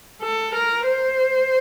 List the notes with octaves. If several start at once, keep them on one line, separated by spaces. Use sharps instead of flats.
A4
A#4
C5